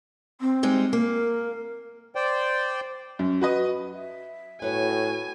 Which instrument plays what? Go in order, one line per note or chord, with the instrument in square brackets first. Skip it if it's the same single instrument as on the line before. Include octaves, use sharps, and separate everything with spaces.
[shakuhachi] C4
[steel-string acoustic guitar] G3 G#3 D#4
[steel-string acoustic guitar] A#3 [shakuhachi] A#4
[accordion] C5 D5 G5
[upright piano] F#2
F#4 B4 D#5
[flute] E5
[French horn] A2 [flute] F#4 [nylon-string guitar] B4 C#5 [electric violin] G#5